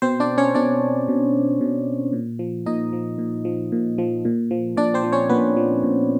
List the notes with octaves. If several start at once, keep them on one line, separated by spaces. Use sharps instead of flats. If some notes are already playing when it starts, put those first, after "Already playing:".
B2 C4 C5
D4 D5
C#4 C#5
B2 D4 D5
B2
B2
A#2
F3
A#2 D#4 D#5
F3
A#2
F3
A#2
F3
A#2
F3
A#2 D4 D5
C4 C5
F3
C#4 C#5
A#2 B3 B4
F3
A#2